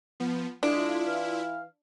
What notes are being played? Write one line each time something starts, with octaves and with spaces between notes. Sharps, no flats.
F3 B3
D3 G#3 D4 E4 F4
E3 F5